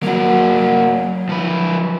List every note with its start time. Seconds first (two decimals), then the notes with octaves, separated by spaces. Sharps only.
0.03 F#3 A#3 F#4
1.29 F3 B4